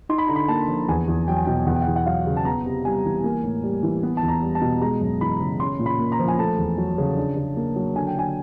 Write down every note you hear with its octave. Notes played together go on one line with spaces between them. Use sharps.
D#4 C6
B5
D3 A#5
B5
A#3 A5
F3
E2 G#5
E2
F#3 G5
G#5
B2 G5
E2 F#5
G5
E2 F#5
F#5
F#3 F5
C#3
A5
B3 A#5
C3
G3 G#5
E3
A#3
A2
G3
E3
B3
A5
E2
A#5
G3
A5
B2
G#3 A#5
F#2
E3 B5
C#3
C#4 C6
A#2
B5
A#3
A#5
F3
G#5
A3 A5
E2
F#3
C#3
D4
C#3
A#3
F#3
D3 G#5
G5
D3 G#5